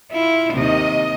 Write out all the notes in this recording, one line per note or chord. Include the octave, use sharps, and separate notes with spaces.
E4 F4
D#2 C3 D#3 D#5